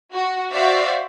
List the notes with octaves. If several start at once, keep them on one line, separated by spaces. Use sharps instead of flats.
F#4
F#4 C5 D5 E5 F5